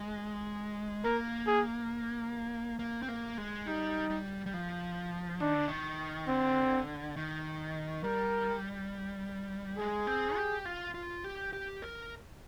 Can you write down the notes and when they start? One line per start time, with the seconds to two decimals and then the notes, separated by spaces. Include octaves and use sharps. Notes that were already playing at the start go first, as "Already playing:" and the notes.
Already playing: G#3
1.04 A#3 A#4
1.48 G#4
2.79 A#3
3.02 C4
3.08 A#3
3.38 G#3
3.67 G3 D#4
4.10 G3
4.46 G3
4.54 F3
5.41 D#3 D4
5.55 D3
5.68 D#3
6.28 D3 C4
7.16 D#3
8.04 G3 A#4
9.78 G#3 G#4
10.07 C4
10.36 G4
10.65 F4
10.94 F4
11.24 G4
11.53 G4
11.82 A#4